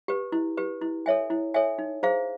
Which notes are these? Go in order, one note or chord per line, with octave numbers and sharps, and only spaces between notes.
G4 B4
E4
G4 B4
E4
A4 C#5 E5 G#5
E4
A4 C#5 E5 G#5
D#4
G#4 C5 F5 A#5